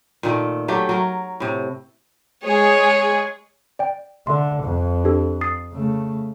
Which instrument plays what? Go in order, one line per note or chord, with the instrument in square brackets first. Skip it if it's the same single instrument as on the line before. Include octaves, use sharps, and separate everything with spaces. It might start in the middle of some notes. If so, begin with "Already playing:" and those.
[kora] A#2 D#3 A3
F#3 A3 G4
F#3 A#4
A2 C3
[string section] G#3 G#4 [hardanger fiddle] C#5
[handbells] D5 G5
[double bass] D3 [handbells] A4 E5 C6
[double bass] F2
[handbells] D4 G4 A4
D#6 A6 C7
[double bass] C#3 A3